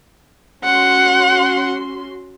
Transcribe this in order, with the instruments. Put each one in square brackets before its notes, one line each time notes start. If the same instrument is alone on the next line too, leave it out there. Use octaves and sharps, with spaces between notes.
[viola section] C#4 F#4 C6 [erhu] F#5